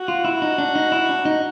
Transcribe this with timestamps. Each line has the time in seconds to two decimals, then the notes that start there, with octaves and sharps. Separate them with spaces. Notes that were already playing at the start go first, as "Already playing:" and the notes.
Already playing: F#4
0.08 F4
0.25 E4
0.42 D#4
0.58 D4
0.76 D#4
0.92 E4
1.09 D4
1.25 D#4